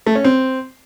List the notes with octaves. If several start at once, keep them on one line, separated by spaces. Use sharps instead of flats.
A3
C#4
C4